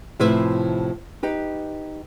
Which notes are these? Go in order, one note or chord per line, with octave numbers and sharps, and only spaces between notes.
A2 C3 F3 E4 B4 E5
D#4 G4 B4